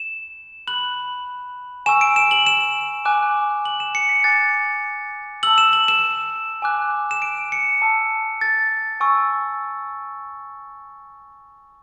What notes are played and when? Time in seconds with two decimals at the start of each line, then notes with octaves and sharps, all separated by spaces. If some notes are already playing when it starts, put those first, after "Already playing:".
Already playing: E7
0.67 B5 F#6 F#7
1.86 G#5 C#6 E6 E7
2.01 D7
2.16 E7
2.31 F#7
2.46 E7
3.05 G#5 D6 F#6
3.65 F#7
3.80 E7
3.95 C#7
4.09 B6
4.24 G#5 D6 F#6 A6
5.43 A5 E6 F#7
5.58 E7
5.73 F#7
5.88 E7
6.62 G#5 D6 F#6
7.11 E7
7.22 D7
7.52 C#7
7.82 A5 E6
8.41 A6
9.00 G#5 C#6 E6